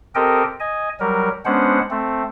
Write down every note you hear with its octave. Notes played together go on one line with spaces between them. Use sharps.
C4 G4 A4 A#4 D#5 G5
D#5 G#5
F#3 G3 A#4
G#3 B3 C#4 D4 C5 F#5
A3 C4